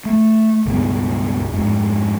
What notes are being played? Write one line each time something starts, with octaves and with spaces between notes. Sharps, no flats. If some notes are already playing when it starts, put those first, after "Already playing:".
A3
C#2 G2 B2
F2 G#2